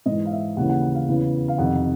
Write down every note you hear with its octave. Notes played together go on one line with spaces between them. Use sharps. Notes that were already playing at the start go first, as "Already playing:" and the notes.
G#2 E3 D#5
F5
E5
D#2 C#3 E3 F#5
F#5
F#5
F5
E2 C#3 E3
F5
F2 C3 D#3 F#5